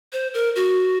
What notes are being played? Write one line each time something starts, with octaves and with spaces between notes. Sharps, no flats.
C5
A#4
F#4